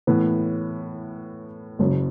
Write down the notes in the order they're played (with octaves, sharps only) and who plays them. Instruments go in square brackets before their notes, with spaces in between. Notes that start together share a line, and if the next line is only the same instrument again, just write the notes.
[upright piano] A2 E3 B3
F#1 F#2 C#3